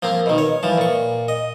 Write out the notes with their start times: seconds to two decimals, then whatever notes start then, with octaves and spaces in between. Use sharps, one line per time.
0.03 F3 A#3 C4
0.26 B2 D#3
0.38 C#5
0.63 E3 F3 A5
0.78 A#2 C#6
1.28 D#5